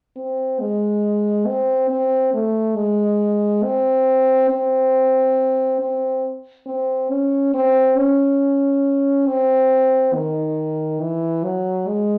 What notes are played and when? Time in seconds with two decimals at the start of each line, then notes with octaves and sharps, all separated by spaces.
0.17 C4
0.60 G#3
1.47 C4
1.90 C4
2.34 A3
2.76 G#3
3.64 C4
4.50 C4
5.81 C4
6.66 C4
7.10 C#4
7.54 C4
7.97 C#4
9.27 C4
10.14 D#3
11.01 E3
11.44 F#3
11.87 G#3